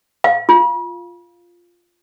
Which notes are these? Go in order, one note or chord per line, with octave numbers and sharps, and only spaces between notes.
F5
F4